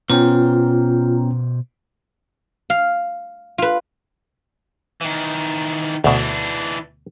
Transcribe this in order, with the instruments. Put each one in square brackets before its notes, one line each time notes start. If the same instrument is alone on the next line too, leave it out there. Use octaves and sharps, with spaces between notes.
[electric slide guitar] B2 C5 [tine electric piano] B3 C#4 G5 [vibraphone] F4 A#5
[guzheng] F5
F4 B4
[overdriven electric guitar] D#3 E3
[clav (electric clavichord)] D2 B2 [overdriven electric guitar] E3 D4